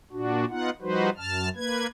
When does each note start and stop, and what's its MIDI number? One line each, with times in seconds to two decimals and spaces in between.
0.12 0.45 46
0.12 0.45 62
0.12 0.45 66
0.50 0.70 59
0.50 0.70 63
0.50 0.70 65
0.50 0.70 78
0.82 1.10 53
0.82 1.10 55
0.82 1.10 63
0.82 1.10 66
0.82 1.10 71
0.82 1.10 72
1.17 1.49 42
1.17 1.49 81
1.17 1.49 89
1.56 1.87 58
1.56 1.87 71
1.56 1.87 92